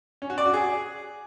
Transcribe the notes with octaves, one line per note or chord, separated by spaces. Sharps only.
C#4
F#4
D5
F#4
G#4